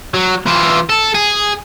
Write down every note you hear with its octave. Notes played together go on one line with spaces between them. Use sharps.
F#3
E3 F4
A4
G#4